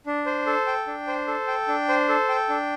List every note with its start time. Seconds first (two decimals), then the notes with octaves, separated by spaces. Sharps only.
0.06 D4
0.26 C5
0.47 A4
0.67 G5
0.87 D4
1.07 C5
1.27 A4
1.48 G5
1.68 D4
1.89 C5
2.09 A4
2.29 G5
2.49 D4